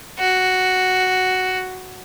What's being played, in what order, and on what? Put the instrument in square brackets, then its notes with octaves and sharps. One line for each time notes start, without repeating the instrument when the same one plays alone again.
[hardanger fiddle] F#4